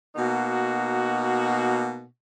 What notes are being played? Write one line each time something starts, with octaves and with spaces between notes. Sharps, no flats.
B2 A#3 D#4 F#4